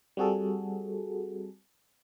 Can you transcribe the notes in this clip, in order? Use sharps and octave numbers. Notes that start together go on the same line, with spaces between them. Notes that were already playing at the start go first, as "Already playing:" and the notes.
G3 C4 F#4 G#4 A4